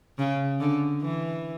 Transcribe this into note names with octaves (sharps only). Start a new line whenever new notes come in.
C#3
D3
E3